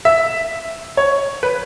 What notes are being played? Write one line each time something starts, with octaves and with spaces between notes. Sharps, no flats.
E5
C#5
B4